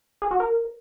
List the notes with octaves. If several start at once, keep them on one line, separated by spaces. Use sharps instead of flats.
G#4
F#4
A#4